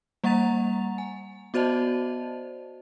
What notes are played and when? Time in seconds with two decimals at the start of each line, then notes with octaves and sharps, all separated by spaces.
0.24 G3 A#3 F#5 A#5 A6 F7
0.98 G#5
1.54 B3 F#4 C5 D5 D#5 A5